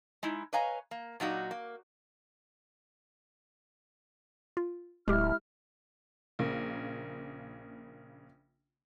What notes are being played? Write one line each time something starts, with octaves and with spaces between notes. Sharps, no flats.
G#3 D#4 E4
B4 C#5 D#5 F5 G#5 A#5
A#3
A#2 F#3 D#4 F#4
A#3
F4
D1 G#3 E4 G4 F6
A#1 C#3 A#3